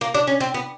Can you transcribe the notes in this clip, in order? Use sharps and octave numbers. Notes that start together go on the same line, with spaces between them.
A#3
D4
C#4
C4
B3